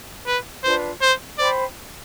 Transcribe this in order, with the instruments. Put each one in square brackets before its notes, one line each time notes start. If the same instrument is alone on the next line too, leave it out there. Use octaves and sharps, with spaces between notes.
[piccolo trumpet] B4
[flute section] D4 F4 B4 [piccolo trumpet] C5
[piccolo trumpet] C5
[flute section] C5 G5 B5 [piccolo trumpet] D5